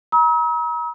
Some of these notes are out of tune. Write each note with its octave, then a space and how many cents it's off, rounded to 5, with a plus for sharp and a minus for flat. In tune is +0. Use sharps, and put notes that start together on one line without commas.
A#5 +40 E6 -45